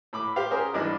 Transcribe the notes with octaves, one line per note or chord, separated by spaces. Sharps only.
A2 B5 D6
G4 C5 F5
C#4 G#4 A#4 C5
G#1 E3 G3 D4 B4 D#5